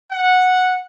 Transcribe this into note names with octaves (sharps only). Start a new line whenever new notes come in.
F#5